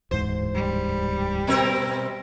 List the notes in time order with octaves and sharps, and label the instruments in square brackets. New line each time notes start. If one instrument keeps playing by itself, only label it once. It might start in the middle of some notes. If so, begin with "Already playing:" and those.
[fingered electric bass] D1 E2 G#2 [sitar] C5
[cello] G3
[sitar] B2 C4 A#4